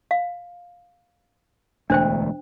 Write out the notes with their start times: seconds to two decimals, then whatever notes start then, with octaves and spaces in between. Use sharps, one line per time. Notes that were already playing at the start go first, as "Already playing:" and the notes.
0.11 F5
1.90 E1 D2 A3 D4 C5 G5